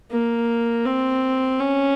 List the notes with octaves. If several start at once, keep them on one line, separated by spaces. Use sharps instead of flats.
A#3
C4
C#4